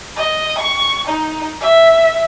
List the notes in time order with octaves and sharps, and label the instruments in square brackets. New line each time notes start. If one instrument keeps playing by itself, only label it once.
[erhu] D#5
C#6
D#4
E5